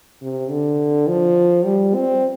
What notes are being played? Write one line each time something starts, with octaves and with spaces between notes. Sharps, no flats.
C3
D3
F3
G3
C4